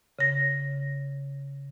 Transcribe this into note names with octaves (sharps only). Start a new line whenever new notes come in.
C#3 A#6